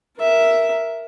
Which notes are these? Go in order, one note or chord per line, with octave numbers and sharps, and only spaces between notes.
A#4 E5